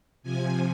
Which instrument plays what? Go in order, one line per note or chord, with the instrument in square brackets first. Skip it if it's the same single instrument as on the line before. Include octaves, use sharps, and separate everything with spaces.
[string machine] C3 F3 G#5